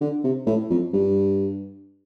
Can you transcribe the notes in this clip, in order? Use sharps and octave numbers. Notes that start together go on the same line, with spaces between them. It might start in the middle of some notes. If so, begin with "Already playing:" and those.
D3
C3
A2
F2
G2